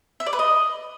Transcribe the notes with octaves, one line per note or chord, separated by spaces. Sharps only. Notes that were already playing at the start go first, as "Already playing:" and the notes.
E5
D5
B4
D#5